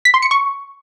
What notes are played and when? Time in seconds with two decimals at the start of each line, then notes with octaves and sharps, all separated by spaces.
0.05 B6
0.14 C6
0.22 C#7
0.31 C#6